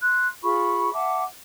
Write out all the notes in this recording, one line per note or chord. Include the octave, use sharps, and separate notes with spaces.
C6 F#6
F4 G#4 B5 C#6
E5 F#5 A5 D6